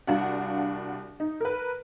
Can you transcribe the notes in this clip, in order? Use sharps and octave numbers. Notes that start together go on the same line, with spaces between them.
C2 D4 F#4 F5 F#5
D#4
A#4 B4